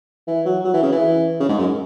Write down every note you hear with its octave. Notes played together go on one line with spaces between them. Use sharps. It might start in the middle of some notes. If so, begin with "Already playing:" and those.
E3
F#3
F#3
E3
C#3
E3
C#3
G#2
F#2